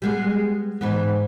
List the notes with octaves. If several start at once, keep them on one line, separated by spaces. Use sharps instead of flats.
G3 G#3 B3
G#2 E3 B3